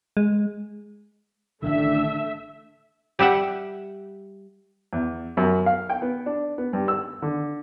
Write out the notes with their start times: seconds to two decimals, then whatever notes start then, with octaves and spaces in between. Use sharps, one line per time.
0.17 G#3
1.62 A1 D3 D#3 A3 D4 E5
3.19 G3 G4 E5 F#5
4.93 E2
5.37 F#2
5.66 F5
5.90 G5
6.02 B3
6.26 D4
6.58 B3
6.73 G2
6.88 E6
7.22 D3